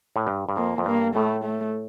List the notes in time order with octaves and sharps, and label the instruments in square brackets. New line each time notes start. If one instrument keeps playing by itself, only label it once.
[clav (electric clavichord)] A2
G2
G2
[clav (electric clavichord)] F2 [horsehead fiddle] A#3
[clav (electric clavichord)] F2
[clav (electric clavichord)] G2 [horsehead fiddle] A#3
[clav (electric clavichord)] A2 [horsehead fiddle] A3
[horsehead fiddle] A3